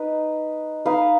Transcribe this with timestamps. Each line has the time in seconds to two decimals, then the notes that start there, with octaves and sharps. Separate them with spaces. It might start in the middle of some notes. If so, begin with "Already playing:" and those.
Already playing: D#4 B4 D#5
0.86 D#4 B4 F5